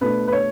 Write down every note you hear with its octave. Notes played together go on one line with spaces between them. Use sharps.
B2 A3 D4 B4
B4
C#5